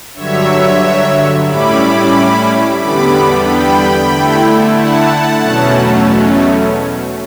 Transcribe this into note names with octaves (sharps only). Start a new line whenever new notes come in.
G2 D3 F#3 C#5 E5
A2 G3 C#4 E4 B5 D6
E2 D3 G3 B3 B5 D6
G5 B5
D3 A3 E4
F#5 A5
E2 B2 F#3 A3 C#4